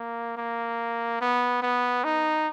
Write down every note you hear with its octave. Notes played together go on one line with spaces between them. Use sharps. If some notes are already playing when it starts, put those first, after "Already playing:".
Already playing: A#3
A#3
B3
B3
D#4